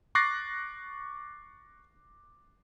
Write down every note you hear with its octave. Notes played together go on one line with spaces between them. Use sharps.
C#6 D6 F#6 A6 A#6 C7